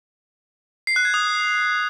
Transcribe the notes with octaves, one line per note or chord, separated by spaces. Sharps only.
C7
F#6
G#6
D#6